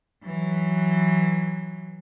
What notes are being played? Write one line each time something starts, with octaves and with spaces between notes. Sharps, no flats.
E3 F#3